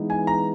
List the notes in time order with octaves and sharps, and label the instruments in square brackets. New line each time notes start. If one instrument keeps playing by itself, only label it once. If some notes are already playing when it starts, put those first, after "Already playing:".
Already playing: [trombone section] E3 G#3 B3 D#4
[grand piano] G#5
A#5